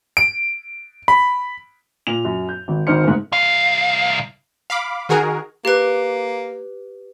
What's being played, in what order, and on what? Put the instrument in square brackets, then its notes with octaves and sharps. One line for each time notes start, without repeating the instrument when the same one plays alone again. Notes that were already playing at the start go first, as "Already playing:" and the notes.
[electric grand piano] D7
B5
[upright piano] A#2 F7
F#2
G6
G#1
G#1 D#3 D#4 C5 F6 C#7
F#1 G#2
[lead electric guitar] C2 F5
[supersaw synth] F5 B5 D6
D#3 F#4 G#4 A#4
[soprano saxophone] A#3 [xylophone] G4 B4